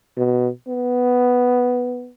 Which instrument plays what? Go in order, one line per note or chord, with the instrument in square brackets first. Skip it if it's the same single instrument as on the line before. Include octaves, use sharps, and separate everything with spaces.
[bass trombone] B2
B3